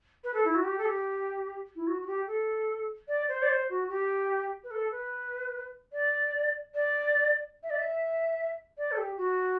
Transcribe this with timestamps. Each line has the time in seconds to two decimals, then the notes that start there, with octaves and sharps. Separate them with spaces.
0.23 B4
0.33 A4
0.44 E4
0.54 F#4
0.64 G4
0.78 A4
0.85 G4
1.75 E4
1.87 F#4
2.01 F#4
2.06 G4
2.27 A4
3.08 D5
3.28 C5
3.42 D5
3.48 C5
3.69 F#4
3.89 G4
4.63 B4
4.70 A4
4.91 B4
5.92 D5
6.74 D5
7.63 E5
7.70 D5
7.78 E5
8.77 D5
8.91 A4
8.97 G4
9.17 F#4